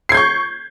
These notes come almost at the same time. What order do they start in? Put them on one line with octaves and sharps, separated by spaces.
C7 G#6 G6 C#6